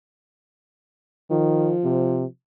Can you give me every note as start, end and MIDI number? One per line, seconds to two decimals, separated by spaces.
1.31 1.75 51
1.31 2.26 53
1.84 2.25 48